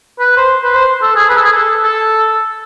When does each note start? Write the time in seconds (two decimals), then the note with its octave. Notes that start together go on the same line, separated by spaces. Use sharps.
0.20 B4
0.37 C5
0.63 B4
0.75 C5
1.02 A4
1.16 G#4
1.29 B4
1.37 A4
1.45 G#4
1.53 A4
1.84 A4